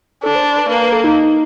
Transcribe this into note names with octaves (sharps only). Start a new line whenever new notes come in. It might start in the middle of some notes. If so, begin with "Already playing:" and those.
D4 A4
C5
C5
B4
A#3 B4
B4
A4
D#4